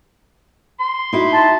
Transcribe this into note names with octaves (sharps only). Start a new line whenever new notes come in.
C6
D#4 E4 F#4
A5